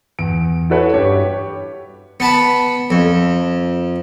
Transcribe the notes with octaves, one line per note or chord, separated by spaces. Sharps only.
E2 D7
E4 F#4 A4 B4 C#5 E5
G2 G4 C#5
B3 A5 B5
F2